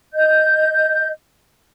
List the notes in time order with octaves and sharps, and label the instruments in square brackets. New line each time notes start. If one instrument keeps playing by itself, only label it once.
[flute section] D#5 G6